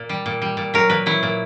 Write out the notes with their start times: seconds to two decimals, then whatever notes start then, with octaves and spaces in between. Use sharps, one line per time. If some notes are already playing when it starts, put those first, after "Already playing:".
Already playing: A#2
0.09 G3
0.26 A#2
0.42 G3
0.57 A#2
0.74 F#3 A#4
0.89 A#2 B4
1.06 F#3 E4
1.23 A#2